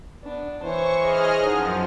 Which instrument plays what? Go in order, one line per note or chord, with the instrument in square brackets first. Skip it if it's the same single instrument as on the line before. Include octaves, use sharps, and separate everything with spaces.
[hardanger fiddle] B3 D4
[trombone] E3 [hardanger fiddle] C5 C#5 [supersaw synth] C#6
[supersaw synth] G#4 D#5 F6
[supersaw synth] F#2 F3 [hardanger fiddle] D#4 F#5